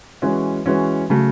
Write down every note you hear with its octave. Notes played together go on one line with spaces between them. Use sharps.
E3 G#3 C#4 F#4
E3 G#3 C#4 F#4
C#3 F#3 A3